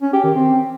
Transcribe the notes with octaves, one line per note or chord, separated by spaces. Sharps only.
C#4
G4
D#3
C4